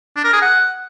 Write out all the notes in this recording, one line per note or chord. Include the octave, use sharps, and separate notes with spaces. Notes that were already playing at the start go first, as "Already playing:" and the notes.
D4
A#4
G#4
F#5